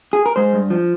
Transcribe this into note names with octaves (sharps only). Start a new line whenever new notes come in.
G#4
A#4
G#3 C5
G2
F3